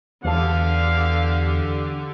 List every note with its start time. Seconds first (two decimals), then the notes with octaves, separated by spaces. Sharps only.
0.25 E2 D3 E3 D4 G4 F5